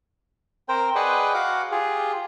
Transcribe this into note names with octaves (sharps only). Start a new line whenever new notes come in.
C4 A#4 C5 G5
G#4 B4 D5 D#5 F#5 G5
F#4 F5 F#5 D6
F4 G4 G#4